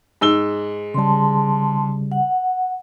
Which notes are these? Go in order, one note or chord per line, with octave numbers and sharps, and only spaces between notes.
G#2 E6 G7
C#3 G3 A5 C6
F#5